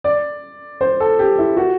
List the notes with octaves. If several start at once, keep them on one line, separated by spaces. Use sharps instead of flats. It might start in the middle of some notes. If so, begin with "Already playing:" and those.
D5
C5
A4
G4
E4
F#4